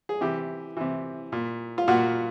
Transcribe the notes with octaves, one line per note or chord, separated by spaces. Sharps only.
G#4
C3 E3 G4
C3 E3
A#2
F4
A#2 F#4